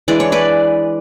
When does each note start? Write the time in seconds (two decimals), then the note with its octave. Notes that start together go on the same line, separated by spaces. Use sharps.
0.08 E3 G#3 D4 D5
0.20 C#5
0.32 B4 D5